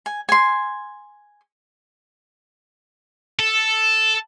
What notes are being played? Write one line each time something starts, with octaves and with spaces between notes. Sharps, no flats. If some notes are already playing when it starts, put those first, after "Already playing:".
G#5
G#5 C6
A4